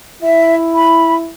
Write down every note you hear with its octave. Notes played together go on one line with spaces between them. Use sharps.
E4 E5
B5